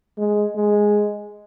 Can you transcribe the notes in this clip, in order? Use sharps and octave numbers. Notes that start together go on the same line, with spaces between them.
G#3
G#3